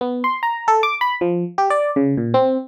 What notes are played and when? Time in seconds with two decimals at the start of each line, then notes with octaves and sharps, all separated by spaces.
0.01 B3
0.24 C6
0.43 A#5
0.68 A4
0.83 D6
1.01 B5
1.21 F3
1.58 G4
1.70 D5
1.96 C#3
2.17 A#2
2.34 C4